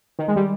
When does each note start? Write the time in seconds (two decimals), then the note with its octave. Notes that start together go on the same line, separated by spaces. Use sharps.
0.19 D#3
0.28 G#3
0.36 G3